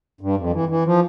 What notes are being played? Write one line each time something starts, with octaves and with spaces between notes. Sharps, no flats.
G2
F2
E3
E3
F3